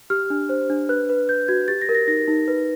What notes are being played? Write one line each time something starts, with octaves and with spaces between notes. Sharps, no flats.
G4 F6
D4
C5
D4
B4 F#6
B4
B4 G6
F#4 G#6
G4 A6
A#6
A#4
A#6
D#4 A#6
D#4
B4